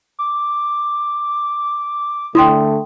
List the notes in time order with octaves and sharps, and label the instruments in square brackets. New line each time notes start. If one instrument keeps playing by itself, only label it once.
[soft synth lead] D6
[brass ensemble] D3 A3 [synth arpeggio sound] E4 [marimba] G5 C6 D#6